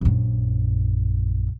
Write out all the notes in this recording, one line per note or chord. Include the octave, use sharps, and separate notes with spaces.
A#1 F#2